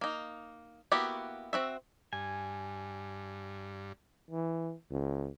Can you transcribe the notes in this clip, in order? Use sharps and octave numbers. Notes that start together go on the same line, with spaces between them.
A#3 D#4
A#3 B3 E4 F#4 G4
C4 F#4 E5
G2 G#5
E3
C#2